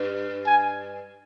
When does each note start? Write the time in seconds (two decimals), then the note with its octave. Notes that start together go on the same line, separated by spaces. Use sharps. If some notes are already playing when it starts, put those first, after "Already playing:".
Already playing: G2
0.46 G#5